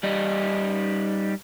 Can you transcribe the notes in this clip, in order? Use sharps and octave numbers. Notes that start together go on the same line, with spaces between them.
G3 D#4